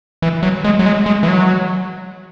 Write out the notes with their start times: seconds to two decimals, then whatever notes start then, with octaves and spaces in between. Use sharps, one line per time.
0.22 E3
0.43 F#3
0.64 G#3
0.79 F#3
0.86 G#3
1.06 G#3
1.23 E3
1.28 F#3